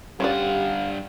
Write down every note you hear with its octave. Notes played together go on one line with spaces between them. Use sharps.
G2 C#4 F4 G4 D5 F5 F#5